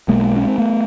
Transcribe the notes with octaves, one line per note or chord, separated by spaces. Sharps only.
B1 B2 G#3 A#3
C#4
C4
A3 B3